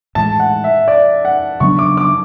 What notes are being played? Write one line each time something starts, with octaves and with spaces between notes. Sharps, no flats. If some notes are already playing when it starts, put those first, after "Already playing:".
A2 E3 G#3 A5
F#5
E5
D5
F#5
C#3 F#3 B3 D4 C#6
D6
D6